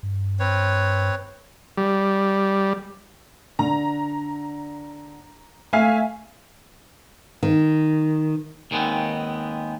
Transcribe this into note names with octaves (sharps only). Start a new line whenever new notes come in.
G2
C4 B4 C#5
G3
D3 A#5
A3 E5 F5 G#5
D#3
D#2 D#3 G#3 B3 C4